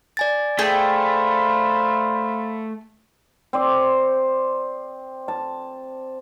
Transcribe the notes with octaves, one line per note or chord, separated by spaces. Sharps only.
D5 G#5 A6
A3 G#4 C5 F5 G5 B5
C4 C5 D5
A5